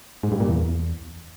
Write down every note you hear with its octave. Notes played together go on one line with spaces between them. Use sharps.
G#2
G2
A#2
E2